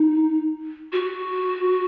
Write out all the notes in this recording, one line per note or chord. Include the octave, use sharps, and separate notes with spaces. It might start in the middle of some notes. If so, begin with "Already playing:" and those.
Already playing: D#4
F#4